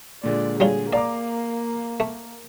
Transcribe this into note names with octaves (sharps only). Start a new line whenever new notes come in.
A#2 D3 G#3 D5
F#3 G3 F4 G#4
A#3 D5 F5 A#5 D6
A3